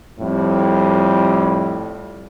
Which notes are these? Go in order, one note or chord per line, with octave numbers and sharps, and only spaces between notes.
F2 A2 G3